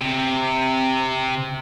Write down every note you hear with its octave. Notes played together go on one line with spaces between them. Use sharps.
C3